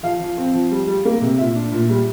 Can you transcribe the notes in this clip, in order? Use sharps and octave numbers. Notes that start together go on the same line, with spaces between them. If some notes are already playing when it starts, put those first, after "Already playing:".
F3 F5
F3
C4
F3
G3
G3
A#3
C3
A#2 E5
D4
A#2
G3